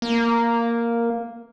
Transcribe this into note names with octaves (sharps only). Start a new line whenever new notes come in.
A#3